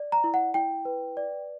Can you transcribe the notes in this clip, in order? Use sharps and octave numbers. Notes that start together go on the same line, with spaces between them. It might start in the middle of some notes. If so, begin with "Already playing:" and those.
Already playing: D5
A#5
E4
F#5
E4 G5
B4
D5